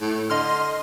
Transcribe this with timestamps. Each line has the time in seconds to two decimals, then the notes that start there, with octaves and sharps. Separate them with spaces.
0.01 A2
0.30 D3 D#5 C6 F6